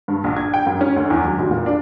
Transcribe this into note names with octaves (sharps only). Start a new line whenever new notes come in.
G2
A#1
G#6
G5
F#2
C#4
D2
E2
F#3
F1
A#2
D4